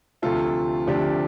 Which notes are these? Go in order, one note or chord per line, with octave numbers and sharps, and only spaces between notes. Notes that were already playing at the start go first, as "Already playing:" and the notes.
D2 C3 F3 A3 F4 A4
D2 C3 F3 A3 D4 G4